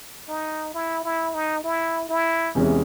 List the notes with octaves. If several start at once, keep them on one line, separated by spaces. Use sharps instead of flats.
D#4
E4
E4
D#4
E4
E4
E2 C3 E3 G#3 C#4